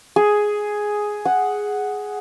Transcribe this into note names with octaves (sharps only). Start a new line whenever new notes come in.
G#4
F#5